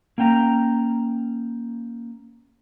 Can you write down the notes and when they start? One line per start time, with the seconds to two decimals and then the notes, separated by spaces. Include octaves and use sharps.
0.18 A#3 C#4 G5 A#5